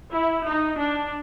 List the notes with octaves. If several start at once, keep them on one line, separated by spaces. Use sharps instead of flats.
E4
D#4
D4